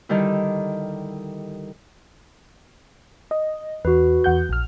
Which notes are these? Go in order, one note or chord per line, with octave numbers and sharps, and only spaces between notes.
D3 D#3 G3 E4
D#5
E2 F#4 B4
E2 F#5 G6
A#1 F6